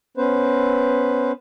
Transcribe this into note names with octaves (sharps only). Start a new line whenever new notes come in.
B3 C#4 B4 C5